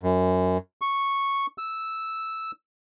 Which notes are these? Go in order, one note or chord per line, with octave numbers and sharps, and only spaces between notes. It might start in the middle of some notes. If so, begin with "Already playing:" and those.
F#2
C#6
E6